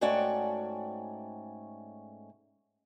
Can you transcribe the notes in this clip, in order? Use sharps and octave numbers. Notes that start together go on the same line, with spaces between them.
G#2 A3 C#4 F#4 D5 G5